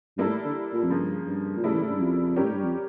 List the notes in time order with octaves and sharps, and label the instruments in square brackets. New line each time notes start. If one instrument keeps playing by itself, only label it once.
[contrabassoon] G2 [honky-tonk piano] G3 A#3 E4 A4
[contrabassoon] A2
D3
A#2
F2
[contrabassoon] G2 [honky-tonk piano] C#3 F3 A#3
[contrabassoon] G2
A#2
[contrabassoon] A2 [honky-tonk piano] C#3 G3 A#3 E4 A4
[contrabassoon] E3
A2
G2
F2
[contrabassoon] A2 [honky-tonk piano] G3 C#4 G4 A#4
[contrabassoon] G2
F2